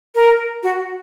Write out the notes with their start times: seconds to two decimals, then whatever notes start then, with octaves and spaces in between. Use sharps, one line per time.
0.15 A#4
0.63 F#4